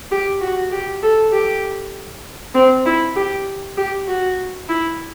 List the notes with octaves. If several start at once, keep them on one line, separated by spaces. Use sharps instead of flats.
G4
F#4
G4
A4
G4
C4
E4
G4
G4
F#4
E4